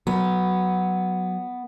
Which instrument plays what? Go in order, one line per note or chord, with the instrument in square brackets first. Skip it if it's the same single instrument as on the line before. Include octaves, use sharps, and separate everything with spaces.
[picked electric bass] F#3 [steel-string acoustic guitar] B3